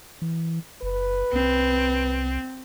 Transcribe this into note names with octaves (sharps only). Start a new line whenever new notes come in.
E3
F#1 B4
C2 C4